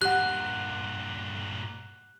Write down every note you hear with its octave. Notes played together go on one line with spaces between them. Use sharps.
G2 A#2 G4 F#5 F#6